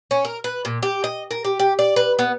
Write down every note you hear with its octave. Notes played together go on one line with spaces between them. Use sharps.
C#4
A#4
B4
A#2
G4
D#5
A#4
G4
G4
D5
B4
B3